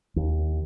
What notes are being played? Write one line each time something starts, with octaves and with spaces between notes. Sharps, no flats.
D#2